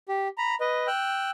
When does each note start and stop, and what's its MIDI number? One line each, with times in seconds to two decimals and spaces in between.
0.08 0.28 67
0.38 0.55 82
0.38 0.55 83
0.61 0.87 71
0.61 0.87 75
0.87 1.31 79
0.87 1.31 88
0.87 1.31 90